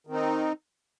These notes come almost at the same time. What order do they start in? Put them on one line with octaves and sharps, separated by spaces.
D#3 C4 D#4